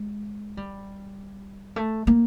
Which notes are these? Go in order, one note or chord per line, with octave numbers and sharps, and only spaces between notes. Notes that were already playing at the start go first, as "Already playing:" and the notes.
Already playing: G#3
G3
A3
A#3